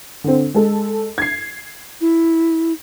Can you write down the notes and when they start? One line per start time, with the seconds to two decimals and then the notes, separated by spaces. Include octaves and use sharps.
0.24 D3 C4
0.54 G#3 A4
1.18 G#6 C7
2.01 E4